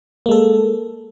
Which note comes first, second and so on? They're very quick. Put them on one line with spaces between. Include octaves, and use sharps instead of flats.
A#3 G#3 A4